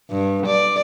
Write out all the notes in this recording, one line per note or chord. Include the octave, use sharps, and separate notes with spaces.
G2
D5